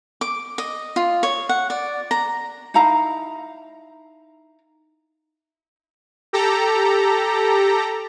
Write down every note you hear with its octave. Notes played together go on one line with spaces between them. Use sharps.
D6
D#5
F4
C#5
F#5
D5
A#5
D#4 E4 F5 A#5
G4 A4 A#5